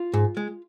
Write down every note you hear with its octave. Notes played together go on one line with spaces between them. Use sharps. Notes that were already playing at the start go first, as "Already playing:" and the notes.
Already playing: F4
G#2
G#3